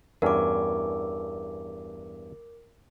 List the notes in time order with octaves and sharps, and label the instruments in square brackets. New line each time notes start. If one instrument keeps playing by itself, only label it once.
[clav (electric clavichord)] E2 G2 C#4 [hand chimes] A#4 D6